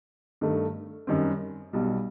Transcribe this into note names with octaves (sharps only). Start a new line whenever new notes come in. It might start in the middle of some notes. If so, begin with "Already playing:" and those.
G2 D#3 A3
F#2 D#3 G3 C4
B1 B2 G3